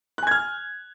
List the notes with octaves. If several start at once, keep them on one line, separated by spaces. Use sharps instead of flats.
G#5 F6 F#6 G#6